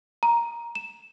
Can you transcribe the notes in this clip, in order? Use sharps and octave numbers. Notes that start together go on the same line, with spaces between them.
A#5
E7